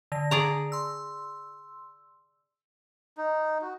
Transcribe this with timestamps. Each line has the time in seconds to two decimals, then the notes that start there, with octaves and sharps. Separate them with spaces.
0.12 D3 A#6
0.31 G#4 D5 A#5
0.72 C6 E6
3.17 D#4
3.62 F#4